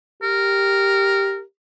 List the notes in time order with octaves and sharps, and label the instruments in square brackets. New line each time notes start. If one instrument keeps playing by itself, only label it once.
[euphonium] G4 [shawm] A#4